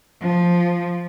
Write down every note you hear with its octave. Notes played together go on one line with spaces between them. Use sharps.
F3